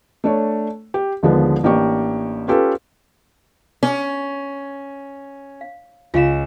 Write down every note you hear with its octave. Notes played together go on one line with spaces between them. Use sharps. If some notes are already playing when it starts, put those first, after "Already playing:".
A3 D4 C#5
G4
D#2 D3 F3 G#3 B3
A1 A#3 D4 G4 C#6
C#4 F4 G4 A4 B4
C#4 G#4
F5
C#2 F4 F5 E7